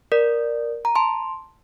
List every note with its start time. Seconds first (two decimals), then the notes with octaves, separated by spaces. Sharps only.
0.12 A#4 D5
0.85 A#5
0.95 A5 C6